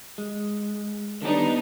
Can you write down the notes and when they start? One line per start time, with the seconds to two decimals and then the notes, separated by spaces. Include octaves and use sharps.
0.18 G#3
1.22 D3 D#3 G3 B3 D4 D#4